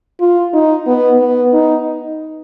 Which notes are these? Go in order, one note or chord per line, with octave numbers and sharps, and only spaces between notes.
F4
D#4
B3
B3
D#4